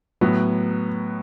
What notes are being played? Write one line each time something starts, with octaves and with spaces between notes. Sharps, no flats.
A2 F#3 B3